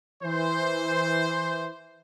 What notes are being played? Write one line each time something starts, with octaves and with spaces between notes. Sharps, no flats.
E3 C5